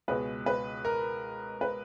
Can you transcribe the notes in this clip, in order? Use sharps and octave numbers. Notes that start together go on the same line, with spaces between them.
C#2 B2 G#3 B4
B4
A#4
B4